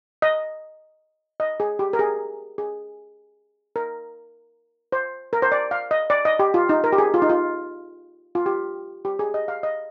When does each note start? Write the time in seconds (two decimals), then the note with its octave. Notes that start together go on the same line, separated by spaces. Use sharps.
0.22 D#5
1.40 D#5
1.60 G#4
1.79 G4
1.93 A#4
1.99 G#4
2.58 G#4
3.76 A#4
4.92 C5
5.33 A#4
5.42 C5
5.52 D5
5.71 F5
5.91 D#5
6.10 D5
6.25 D#5
6.39 G4
6.54 F4
6.69 D#4
6.84 A#4
6.93 G4
6.98 G#4
7.14 F4
7.22 D#4
7.29 F4
8.35 F4
8.46 G4
9.05 G4
9.19 G#4
9.34 D#5
9.48 F5
9.63 D#5